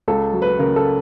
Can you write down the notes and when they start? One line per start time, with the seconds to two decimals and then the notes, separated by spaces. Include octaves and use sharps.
0.08 C#2 A4
0.33 F#3
0.42 B4
0.59 C#3 A#4
0.76 A4